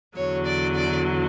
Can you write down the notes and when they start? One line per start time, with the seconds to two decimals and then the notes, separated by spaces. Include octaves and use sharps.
0.16 E2 D3 F#3 C#5
0.46 D5
0.75 D5